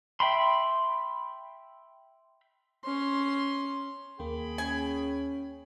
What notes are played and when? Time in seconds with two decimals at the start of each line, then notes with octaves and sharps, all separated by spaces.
0.20 E5 G5 B5 C6
2.85 C#4 C6
4.20 D#2 A#3 G#4 G5 B5
4.58 C#4 G#5